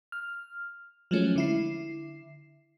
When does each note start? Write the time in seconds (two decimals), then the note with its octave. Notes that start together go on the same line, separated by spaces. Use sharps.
0.12 F6
1.11 F3 F#3 G#3 A3 C#4
1.36 D3 E4 C7